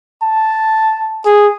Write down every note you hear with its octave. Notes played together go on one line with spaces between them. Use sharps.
A5
G#4